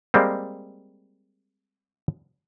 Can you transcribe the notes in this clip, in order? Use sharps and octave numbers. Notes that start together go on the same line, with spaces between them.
G3 G#3 A#3 C4